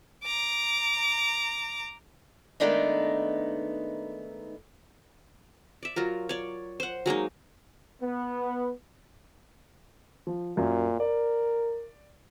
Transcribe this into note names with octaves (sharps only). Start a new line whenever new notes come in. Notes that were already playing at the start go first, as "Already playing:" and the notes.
A#5 D6
D#3 G#3 A3 B3 D4 D#4
D5 E5
F#3 F4 A#4
C#5 D5
C5 F#5
F#3 G#3 A#3 D#4
B3
F3
F#2 A#2
A#4 D5